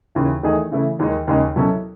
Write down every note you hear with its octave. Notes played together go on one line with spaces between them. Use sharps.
D#2 C#3 E3
E2 D#3 A3 D#4 G#4
C#3 E3 A3 E4
D#2 D#3 G#3 D#4
D#2 C#3 G#3 D#4 G#4
B2 F#3 C#4 E4 A4